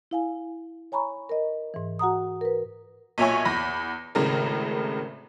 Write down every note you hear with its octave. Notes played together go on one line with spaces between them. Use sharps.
E4 F5 G#5
C#5 G#5 A#5 B5 C#6
A#4 D#5
G#2 E3
F#4 F#5 A#5 D#6
A#4 B4
B1 A#2 C#5 E5 G#5 C#6
E2 B5 A#6
G#1 A2 C#3 A#4